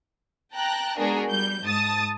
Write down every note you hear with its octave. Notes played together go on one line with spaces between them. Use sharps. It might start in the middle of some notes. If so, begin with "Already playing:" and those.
G5 A5 A#5 F#6
G#3 B3 D4 F#4 G#4 A#4
G3 G6
G#2 A5 D#6 A6